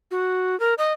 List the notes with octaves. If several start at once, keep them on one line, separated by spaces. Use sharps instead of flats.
F#4
A#4
D#5